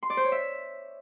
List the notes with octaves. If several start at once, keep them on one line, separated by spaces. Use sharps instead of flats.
C6
D5
C5
C#5
E5